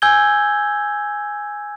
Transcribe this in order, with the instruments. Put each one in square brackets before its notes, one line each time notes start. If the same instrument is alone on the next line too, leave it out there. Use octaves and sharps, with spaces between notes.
[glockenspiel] G#5 E6 G6 G#6 G7